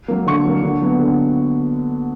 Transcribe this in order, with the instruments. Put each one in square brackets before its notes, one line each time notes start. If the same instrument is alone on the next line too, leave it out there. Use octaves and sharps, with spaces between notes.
[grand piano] F#3 A#3
D3 C#6
F#3 A#3
D3
F#3 B3
D3